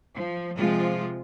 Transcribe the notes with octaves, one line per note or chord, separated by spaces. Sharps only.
F3
C3 F3 G#3 F4